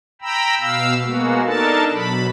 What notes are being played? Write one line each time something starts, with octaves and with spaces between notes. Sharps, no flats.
G5 A#5 B5 E6
B2 F5 E6
G#3 A#3 B3 F#4
D4 D#4 A4 A#4 A5
B2 F#3 B5